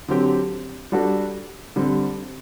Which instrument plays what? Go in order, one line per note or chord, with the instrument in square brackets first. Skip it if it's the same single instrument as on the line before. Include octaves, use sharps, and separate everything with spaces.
[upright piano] D3 F#3 C4 G4
G3 D4 F#4 A4
D3 G3 C4